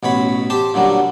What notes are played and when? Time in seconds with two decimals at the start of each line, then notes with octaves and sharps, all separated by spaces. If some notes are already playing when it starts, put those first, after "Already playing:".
0.03 A1 B2 C#5 B5
0.50 G4 C5 A5
0.74 A#2 D3 F#3 G3